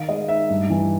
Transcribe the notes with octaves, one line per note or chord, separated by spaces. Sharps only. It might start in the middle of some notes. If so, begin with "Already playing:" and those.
Already playing: D#3 F5
G#3 D#5
D#4 E5
G2
E3